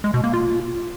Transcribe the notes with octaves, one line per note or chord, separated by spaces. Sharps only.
G#3
B2
A#3
F4